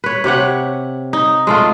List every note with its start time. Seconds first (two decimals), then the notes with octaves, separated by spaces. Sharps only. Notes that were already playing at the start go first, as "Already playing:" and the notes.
0.04 B4 C#5
0.24 C3 G4 C#5 F#5
1.13 D#4
1.47 G#3 A3 F4